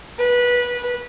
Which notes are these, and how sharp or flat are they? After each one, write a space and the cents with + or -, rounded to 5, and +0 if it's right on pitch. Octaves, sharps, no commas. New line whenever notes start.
B4 -20